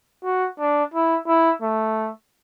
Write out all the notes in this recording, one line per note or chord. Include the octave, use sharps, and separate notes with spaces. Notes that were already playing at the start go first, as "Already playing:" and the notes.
F#4
D4
E4
E4
A3